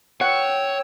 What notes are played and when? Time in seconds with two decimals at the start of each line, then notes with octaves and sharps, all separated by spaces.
0.21 C#5 F#5 G5 E6